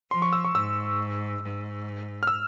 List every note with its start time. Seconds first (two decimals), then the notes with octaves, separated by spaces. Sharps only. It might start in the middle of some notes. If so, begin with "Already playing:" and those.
0.11 F3 C6
0.22 C#6
0.33 E6
0.45 C#6
0.54 G#2 E6
1.41 G#2
2.23 F6
2.27 E6